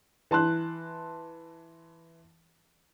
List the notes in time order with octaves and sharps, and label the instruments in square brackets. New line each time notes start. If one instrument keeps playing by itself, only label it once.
[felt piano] E3 A5 C6 F#6